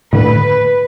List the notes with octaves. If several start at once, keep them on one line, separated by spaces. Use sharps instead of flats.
A2 D3 B4